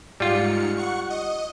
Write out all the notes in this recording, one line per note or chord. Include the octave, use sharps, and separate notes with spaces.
G#2 G3 F4 F6 C#7
F#5 C#6 C#7
D#5